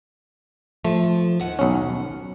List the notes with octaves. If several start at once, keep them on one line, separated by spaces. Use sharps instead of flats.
F3 A3
D#2 F#5
B1 C#4